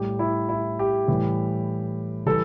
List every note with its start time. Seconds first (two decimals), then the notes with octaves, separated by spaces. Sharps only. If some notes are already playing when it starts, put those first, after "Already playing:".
Already playing: A2 G3 G4
0.19 E4
0.49 E4
0.79 G4
1.08 A2 E3 G3
2.26 E3 G3 A4